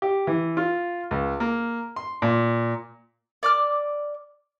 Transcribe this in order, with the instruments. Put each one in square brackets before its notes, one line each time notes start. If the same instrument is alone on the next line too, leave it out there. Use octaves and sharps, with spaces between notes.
[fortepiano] G4
E3
F4
C#2
A#3
C6
A#2
[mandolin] D5 D6 F6